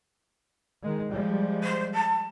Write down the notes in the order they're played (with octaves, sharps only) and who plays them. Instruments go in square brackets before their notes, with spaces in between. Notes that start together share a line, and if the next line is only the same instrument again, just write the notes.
[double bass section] D#3 G#3
F3 G3 G#3
[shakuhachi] C5
A5